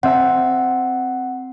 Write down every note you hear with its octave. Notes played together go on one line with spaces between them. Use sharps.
C4 E5 F#5 A#5